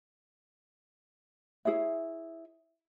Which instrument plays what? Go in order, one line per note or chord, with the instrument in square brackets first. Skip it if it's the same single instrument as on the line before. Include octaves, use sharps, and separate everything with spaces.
[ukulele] E4 G#4 C#5 E5